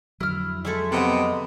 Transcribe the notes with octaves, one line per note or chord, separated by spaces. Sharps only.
F2 D3 F#3 E4 F6
G#3 A3 E4 A4 E5
C3 B3 B4 D#5 F#5